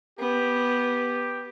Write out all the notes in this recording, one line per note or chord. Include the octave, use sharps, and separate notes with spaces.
B3 G4